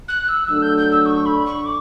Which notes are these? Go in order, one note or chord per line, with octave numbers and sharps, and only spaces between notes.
F#6
F#6
E6
F#3 A3 D4 A4 E6
G6
G6
E6
C#6
B5
C#6
D6